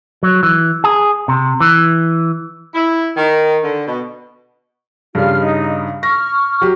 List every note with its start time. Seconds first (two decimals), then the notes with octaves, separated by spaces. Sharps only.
0.23 F#3
0.43 E3
0.84 G#4
1.28 C3
1.60 E3
2.75 E4
3.17 D#3
3.64 D3
3.88 B2
5.15 G2 C#3 G3 F4 F6
5.40 D#4
6.03 C#6 F6 A#6
6.61 F#3 G4